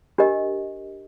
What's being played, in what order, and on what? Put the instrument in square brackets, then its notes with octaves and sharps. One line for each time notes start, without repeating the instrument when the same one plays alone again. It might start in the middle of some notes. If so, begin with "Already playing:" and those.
[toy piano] D4 G4 A#4 D#5